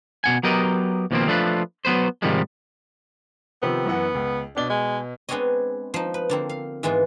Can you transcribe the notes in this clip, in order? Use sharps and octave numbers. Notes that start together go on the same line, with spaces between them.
B2 F#5 G#5
F#3 B3 G4 A#4 D#5
D#2 B2 F3 G#3 A#3 C4
F3 A3 D4 F4 B4
F#3 B3 B4 C5
G#2 C3 D#3 F3 G3 G#3
C3 D#3 F3 B3
F#2 E3 F#5
C#2
B2 D4 G7
G#3
G#3 B3 C4 D4 C#5 D#5
F3 D#4
B4
D3 A#3 C4
F5
G#2 E3 G#3 B3 F4